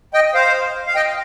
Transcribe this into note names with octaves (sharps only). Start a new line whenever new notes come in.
D#5 G5
C5 F5
F5
D#5 G5